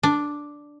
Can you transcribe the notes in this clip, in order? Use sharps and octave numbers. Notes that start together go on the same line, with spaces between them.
D4